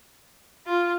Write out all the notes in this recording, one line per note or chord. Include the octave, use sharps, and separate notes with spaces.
F4